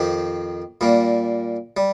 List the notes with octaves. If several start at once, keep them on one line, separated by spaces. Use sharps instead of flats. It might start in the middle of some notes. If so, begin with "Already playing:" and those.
Already playing: F2 D#3 C4 G4
A#2 G3 A#3
G3